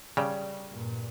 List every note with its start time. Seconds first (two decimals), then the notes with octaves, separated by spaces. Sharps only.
0.17 C#3 G3
0.68 G2 A#2